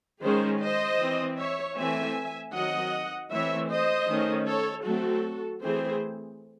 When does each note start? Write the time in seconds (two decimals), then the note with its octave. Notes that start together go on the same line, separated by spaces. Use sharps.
0.22 D#3 G#3 C#4 G#4 C5
0.61 C5 D#5
0.99 E3 C4
1.37 C#5 E5
1.76 E3 A3 C4 E5 G#5
2.53 D#3 F#3 C4 D#5 F#5
3.30 E3 A3 C4 C#5 E5
3.69 C5 D#5
4.08 D#3 A3 C#4
4.46 A4 C#5
4.85 F#3 A3 C4 F#4 A4
5.62 E3 A3 C4 G#4 C5